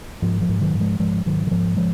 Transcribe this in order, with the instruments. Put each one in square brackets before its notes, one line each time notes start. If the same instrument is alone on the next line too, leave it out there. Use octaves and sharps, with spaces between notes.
[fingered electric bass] G#2 F3
F3
G#2
D#3 F#3
G#2
F3 G#3
G#2 F3 G#3
G#2 D#3 F#3
D#3
G#2 F3
F3 G#3